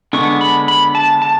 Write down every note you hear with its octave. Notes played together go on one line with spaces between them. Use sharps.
D3 G#3 B3 D4 C#6
B5
B5
A5
A5